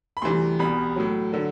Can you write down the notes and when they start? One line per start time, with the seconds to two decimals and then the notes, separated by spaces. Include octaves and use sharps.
0.17 B5
0.22 D2 C3 E3 G3 C6
0.59 C2 B2 G3 B5
0.96 A2 F#3
1.32 D3 F#3